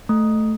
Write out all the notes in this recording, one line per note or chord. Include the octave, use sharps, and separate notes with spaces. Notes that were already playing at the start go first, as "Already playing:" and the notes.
A3